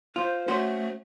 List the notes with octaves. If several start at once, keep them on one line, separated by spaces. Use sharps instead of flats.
F4 C5
A3 C#4 F#4 C5